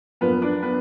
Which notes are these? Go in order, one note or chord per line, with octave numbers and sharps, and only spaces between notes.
F#2 F3 A#3 B3 D4 F4 B4
D4 D5
B3 B4